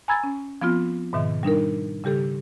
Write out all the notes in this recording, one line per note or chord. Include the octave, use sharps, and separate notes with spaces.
G#5 A#5 B5 E6 G#6 A6
C#4
F3 B3 C4 F4
G#2 B2 D#3 E5
G3 D4 D#4 A#4
C#3 G3 G4 A4